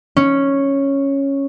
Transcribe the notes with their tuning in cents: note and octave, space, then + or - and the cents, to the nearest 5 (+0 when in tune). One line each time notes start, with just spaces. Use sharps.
C#4 -5